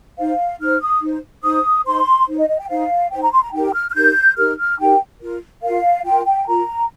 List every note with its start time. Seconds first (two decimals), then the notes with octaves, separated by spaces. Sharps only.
0.18 D#4 C5 F5
0.60 D#4 C5 F6
0.81 D#6
1.01 D#4 C5
1.43 D#4 C5 D#6
1.85 D#4 C5 C6
2.28 D#4 C5
2.39 D#5
2.49 D#5
2.59 G5
2.69 D#4 C5 F5
3.11 D#4 C5 G5
3.22 A#5
3.32 C6
3.43 A#5
3.53 D#4 G4 A#4 G5
3.74 F6
3.90 F6
3.95 D#4 G4 A#4 G6
4.37 D#4 G4 A#4 F6
4.59 F6
4.79 D#4 G4 A#4 G5
5.21 F4 A#4
5.63 F4 A#4 F5
6.05 F4 A#4 G5
6.26 G5
6.47 F4 A#4 A#5